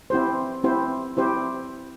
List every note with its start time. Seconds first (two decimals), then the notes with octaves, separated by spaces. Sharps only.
0.10 C4 E4 G4 C5
0.64 C4 E4 G4 C5
1.17 C4 E4 G4 C5